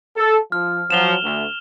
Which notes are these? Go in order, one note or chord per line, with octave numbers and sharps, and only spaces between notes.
A4
F3 F6
F3 F#3 E7 F7 G7
D2 A3